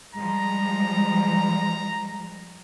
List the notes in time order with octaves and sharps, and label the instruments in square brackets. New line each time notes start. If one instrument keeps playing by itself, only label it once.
[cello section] F3 G3 G#3 [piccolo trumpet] A#5